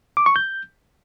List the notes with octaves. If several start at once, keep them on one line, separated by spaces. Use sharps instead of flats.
D6
C#6
G6